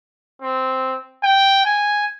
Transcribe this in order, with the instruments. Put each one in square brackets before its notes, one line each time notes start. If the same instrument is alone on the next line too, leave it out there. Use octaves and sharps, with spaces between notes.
[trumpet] C4
G5
G#5